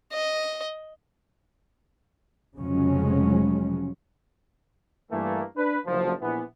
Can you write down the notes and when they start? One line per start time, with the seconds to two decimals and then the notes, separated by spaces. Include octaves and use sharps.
0.12 D#5
2.56 F1 C#3 F3 F#3 G#3 C#4
5.12 G2 E3 A3 A#3
5.56 D4 B4
5.86 F#1 D2 F3
6.21 A#1 E3 B3